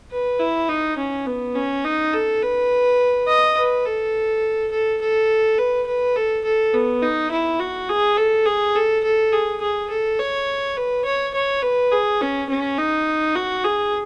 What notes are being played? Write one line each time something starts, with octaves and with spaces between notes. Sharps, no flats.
B4
E4
D#4
C#4
B3
C#4
D#4
A4
B4
D#5
B4
A4
A4
A4
B4
B4
A4
A4
B3
D#4
E4
F#4
G#4
A4
G#4
A4
A4
G#4
G#4
A4
C#5
B4
C#5
C#5
B4
G#4
C#4
C#4
D#4
F#4
G#4